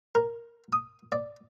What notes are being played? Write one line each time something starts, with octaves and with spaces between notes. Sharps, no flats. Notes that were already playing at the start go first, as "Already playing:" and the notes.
A#4
D#6
D5